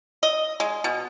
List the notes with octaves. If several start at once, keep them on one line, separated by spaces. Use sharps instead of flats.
D#5
G#3
B2